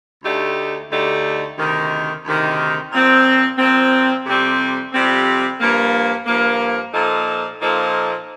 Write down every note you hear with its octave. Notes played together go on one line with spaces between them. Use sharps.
D2 D3 A3 D#4 G4
D2 D3 A3 D#4 G4
D2 C3 D#3
D2 C3 D#3
A#2 F3 C4
A#2 F3 C4
F2 C3 G3 C4
F2 C3 G3 C4
G2 F3 A#3
G2 F3 A#3
A#2 F3 A#3 D#4 A4
A#2 F3 A#3 D#4 A4